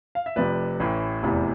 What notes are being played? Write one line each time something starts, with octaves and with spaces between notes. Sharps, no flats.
F5
E5
F1 F2 C3 B4 D5
A1 A2 E3
F1 E2 C3 E3